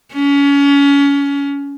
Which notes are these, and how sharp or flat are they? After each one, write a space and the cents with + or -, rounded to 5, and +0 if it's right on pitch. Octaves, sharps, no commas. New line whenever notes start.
C#4 +30